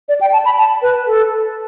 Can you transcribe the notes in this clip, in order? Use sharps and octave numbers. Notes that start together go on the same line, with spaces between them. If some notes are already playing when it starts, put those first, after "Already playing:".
D5
G5
A5
B5
A5
B4
A4